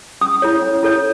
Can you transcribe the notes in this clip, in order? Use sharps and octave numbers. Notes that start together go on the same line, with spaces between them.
C#4 D#6
E4 A4 C#5
C#4
E4 A4 C#5